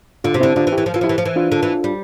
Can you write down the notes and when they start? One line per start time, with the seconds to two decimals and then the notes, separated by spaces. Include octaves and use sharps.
0.24 D3 D4 F4
0.34 C3
0.40 D3 C4 E4
0.56 D3 D4 F4
0.67 E3
0.72 E4 G4
0.78 E3
0.86 F3
0.94 E3 F4
1.01 F3 E4 G4
1.09 E3
1.18 F3
1.25 E3
1.36 D4 F4
1.52 D3
1.63 E3
1.84 G3